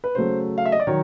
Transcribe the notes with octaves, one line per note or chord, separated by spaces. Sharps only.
B4
C#3 F#3 A3 C5
F5
E5
D#5
D5
D#3 F#3 C#5